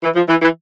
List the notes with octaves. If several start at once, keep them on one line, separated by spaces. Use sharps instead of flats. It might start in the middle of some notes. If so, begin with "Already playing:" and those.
E3
F3
E3
E3